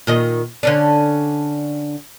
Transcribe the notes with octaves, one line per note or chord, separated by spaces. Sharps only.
A#2 D#3 D#5
D3 C#4 D4